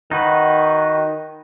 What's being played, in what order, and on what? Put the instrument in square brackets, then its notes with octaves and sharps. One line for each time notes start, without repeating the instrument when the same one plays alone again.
[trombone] D#3 [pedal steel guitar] D#4 F#4 B4